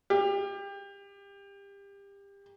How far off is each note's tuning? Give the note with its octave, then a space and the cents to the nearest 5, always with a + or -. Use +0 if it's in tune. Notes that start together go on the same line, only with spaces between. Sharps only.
G4 +25